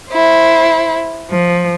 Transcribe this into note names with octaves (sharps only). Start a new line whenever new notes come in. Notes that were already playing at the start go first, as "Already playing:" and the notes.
E4 C5
F3